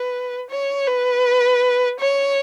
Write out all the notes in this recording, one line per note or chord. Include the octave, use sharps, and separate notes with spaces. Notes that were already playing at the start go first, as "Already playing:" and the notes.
Already playing: B4
C#5
B4
C#5